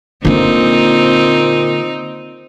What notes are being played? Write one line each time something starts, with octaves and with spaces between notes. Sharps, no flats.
A#2 D3 A#3 C4 D#4